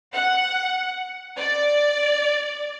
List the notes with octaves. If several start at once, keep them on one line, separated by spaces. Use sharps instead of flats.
F#5
D5